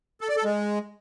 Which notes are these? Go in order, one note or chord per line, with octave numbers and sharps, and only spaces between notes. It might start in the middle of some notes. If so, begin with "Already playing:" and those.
A4
D5
A4
G#3